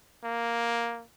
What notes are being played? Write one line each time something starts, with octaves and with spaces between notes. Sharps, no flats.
A#3